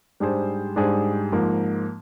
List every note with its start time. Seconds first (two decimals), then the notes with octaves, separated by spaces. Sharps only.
0.20 G#2 G3 D4 G#4 C5
0.76 G#2 G3 D4 G#4 C5
1.32 G#2 F3 A#3